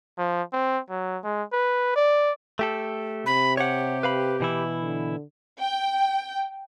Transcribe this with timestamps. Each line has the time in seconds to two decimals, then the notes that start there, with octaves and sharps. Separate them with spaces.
0.18 F3
0.53 C4
0.90 F#3
1.24 G#3
1.53 B4
1.96 D5
2.59 A3 G4 A4
3.26 C3 B5
3.57 G4 C#5 F#5
4.03 B4 F5 B5
4.40 B2 E3 E4
4.80 D3
5.59 G5